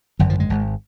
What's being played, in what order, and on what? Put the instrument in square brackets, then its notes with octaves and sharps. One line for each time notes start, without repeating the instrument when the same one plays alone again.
[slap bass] G#1 F#2 D3 F#3
F3
G#3
G#1 G#2